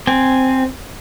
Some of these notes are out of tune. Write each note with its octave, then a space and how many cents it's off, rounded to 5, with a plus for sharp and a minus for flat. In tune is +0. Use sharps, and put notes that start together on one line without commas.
C4 +0 G#5 +0